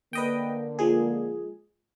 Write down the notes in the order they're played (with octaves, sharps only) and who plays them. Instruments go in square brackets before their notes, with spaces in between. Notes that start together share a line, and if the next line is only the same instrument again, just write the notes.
[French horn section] D3 A#3 [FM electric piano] B4 D#5 G5
[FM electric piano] F3 G#3 G#4